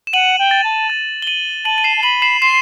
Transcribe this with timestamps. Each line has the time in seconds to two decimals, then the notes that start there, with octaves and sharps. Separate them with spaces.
0.07 E7
0.13 F#5 D#7 F#7
0.39 G5
0.51 A6
0.64 A5
0.90 A6
1.22 G7
1.27 D#7 F#7
1.65 A5 D#7 F#7
1.78 D#7
1.84 C7 E7
1.97 A5
2.03 B5 D#7 F#7
2.22 C7 E7
2.42 C6 C7 E7